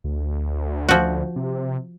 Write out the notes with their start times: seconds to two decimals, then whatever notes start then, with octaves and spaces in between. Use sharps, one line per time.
0.04 D2
0.89 F3 F#4
1.36 C3